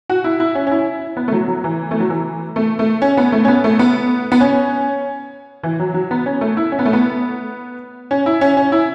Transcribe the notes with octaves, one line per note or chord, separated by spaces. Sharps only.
F#4
E4
E4
C#4
C#4
E4
B3
A3
F#3
F#3
E3
A3
F#3
E3
A3
A3
C#4
B3
A3
C#4
B3
A3
B3
B3
C#4
E3
F#3
F#3
B3
C#4
A3
E4
C#4
B3
A3
B3
C#4
E4
C#4
C#4
E4